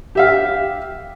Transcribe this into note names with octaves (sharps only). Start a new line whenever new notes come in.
G4 E5 F5